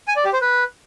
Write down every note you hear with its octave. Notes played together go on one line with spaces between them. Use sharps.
G#5
D5
G4
C5
B4